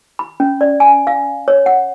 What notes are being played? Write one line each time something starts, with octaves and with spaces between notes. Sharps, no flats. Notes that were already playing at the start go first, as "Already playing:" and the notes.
B5
C#4
D5
G#5
F5
C#5
F#5